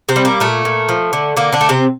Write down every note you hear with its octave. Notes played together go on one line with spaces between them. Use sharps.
C3 C4
G3
A#3
A#2 A3
A#2
F3
D3
D3 A#3
D3 D4
A3
C3 C4